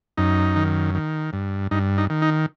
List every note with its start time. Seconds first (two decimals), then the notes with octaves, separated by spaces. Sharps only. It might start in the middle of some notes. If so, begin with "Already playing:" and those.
0.18 F#2 D#4
0.56 D#3
0.95 D#3
1.33 G2
1.71 G2 D#4
1.98 D#4
2.10 D#3
2.22 D#4